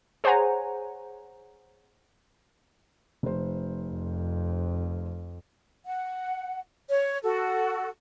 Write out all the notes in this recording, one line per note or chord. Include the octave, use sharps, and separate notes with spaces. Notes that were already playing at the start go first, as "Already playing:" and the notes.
G#4 C5 C#5 F#5 G#5 A#5
F1 C5
F2
F#5
C#5
F#4 A4